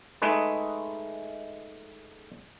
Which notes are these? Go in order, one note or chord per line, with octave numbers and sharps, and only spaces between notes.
G#3 A3 D#4 G#4 B4